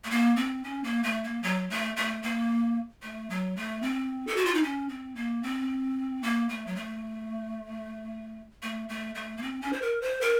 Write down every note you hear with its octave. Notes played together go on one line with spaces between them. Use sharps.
A3
A#3
C4
C#4
A#3
A3
A#3
F#3
A3
A3
A#3
A3
F#3
A3
C4
A4
F#4
F4
D#4
C#4
C4
A#3
C4
A#3
A3
F#3
A3
A3
A3
A3
A#3
C4
C#4
C5
A#4
C5
A#4